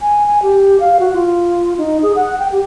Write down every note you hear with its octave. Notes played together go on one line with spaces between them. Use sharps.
G#5
G#5
G4
F5
F#4
F4
D#4
G#4
F#5
G5
G4